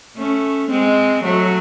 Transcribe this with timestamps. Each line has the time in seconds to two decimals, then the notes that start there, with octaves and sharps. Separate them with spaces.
0.16 A3 C#4
0.70 G#3 C4
1.24 F#3 A3